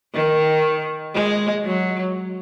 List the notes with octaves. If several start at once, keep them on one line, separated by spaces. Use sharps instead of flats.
D#3
G#3
F#3